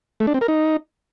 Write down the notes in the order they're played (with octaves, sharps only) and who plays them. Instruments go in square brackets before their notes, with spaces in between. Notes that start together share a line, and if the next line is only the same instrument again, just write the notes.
[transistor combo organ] A3
D4
C4
A#4
D#4